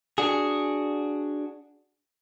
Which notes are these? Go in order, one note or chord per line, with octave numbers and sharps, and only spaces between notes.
D4 F#4 G#4